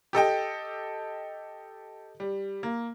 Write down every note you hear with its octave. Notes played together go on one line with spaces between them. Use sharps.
G4 A4 D#5 G5
G3
A#3